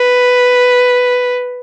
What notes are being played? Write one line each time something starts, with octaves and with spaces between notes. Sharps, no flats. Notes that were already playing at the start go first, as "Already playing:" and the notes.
Already playing: B4